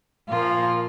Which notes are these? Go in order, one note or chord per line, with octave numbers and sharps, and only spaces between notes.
A#2 F3 A#3 F4